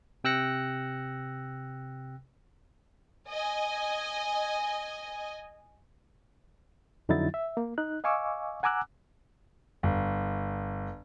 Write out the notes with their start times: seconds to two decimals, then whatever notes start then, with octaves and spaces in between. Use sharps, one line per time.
0.24 C3 G5 E6 F#6 A#6 C#7
3.30 D#5 G#5
7.09 F2 D3 F#3 D#4 E4 A6
7.34 E5
7.57 A#3
7.78 D#4 F#6
8.04 D#5 F5 G#5 C#6 D6 E6
8.63 F#5 G#5 A#5 D6 E6 F#6
9.83 G1